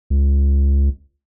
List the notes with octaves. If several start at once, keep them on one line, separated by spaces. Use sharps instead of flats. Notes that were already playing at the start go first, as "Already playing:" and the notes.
C#2